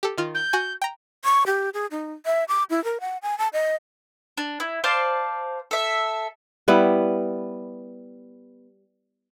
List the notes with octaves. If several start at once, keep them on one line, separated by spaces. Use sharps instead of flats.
G4 A4
D#3 F4
G6
F#4 G#5
G5 A#5
C#6
G4
G#4
D#4
E5
D6
E4
A#4
F#5
G#5
A5
D#5
D4
E4
C5 D5 F5 A5
A4 E5
G3 B3 E4